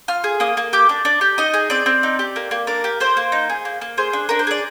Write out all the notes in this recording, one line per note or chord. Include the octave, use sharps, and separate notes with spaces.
F4 F6
G#4
A#3 D#6
A#3
G4 D6
D4
D4
G4
D#4 D#5
G#4
C4 D5
C4
D#4
G4
A#3
A#3
D4 A#4
G4
A#3 C5
A#3
D#4
G#4
A#3
A#3
G#4 C5
D4
D4 A#4
C5
G#4 D5